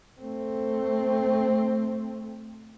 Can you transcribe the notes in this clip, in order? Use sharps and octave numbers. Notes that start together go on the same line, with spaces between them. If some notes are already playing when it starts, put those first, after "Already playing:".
A3 C4